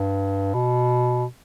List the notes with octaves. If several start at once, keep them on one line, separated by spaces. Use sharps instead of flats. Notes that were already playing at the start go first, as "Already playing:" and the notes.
Already playing: G2
B2